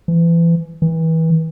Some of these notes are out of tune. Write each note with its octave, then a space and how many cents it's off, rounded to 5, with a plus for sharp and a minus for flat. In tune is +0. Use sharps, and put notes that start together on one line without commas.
E3 +30
E3 -30